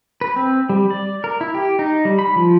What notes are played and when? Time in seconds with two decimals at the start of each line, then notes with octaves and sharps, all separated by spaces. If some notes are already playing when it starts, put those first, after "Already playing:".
0.21 B4
0.36 C4
0.69 G3
0.90 D5
1.24 A#4
1.41 E4
1.54 G4
1.79 D#4
2.05 G3
2.19 B5
2.36 F3